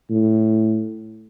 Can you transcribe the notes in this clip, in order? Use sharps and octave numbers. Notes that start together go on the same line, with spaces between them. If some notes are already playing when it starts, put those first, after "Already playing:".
A2